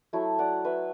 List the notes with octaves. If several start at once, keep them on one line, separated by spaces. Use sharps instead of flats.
F#3 A3 E4
D5 F#5
B4 E5